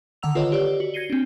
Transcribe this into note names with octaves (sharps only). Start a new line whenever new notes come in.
D3 D#3 F#5 A#5 E6 F7
F4 A4 B4 C#5 D#5
G4 C#5 D5
F#4
G#6 A#6 C7 C#7 D#7 G7
C4 D4